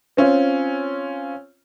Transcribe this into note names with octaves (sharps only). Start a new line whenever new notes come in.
C4 C#4 F4